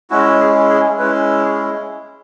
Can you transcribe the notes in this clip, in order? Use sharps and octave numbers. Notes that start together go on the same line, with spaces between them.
G#3 C#4 E4 F#4
G#4
G#4
G#3 C#4 E4 B4
G#4